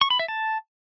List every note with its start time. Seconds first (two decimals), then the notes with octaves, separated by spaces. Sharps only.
0.01 C#6
0.10 B5
0.19 E5
0.28 A5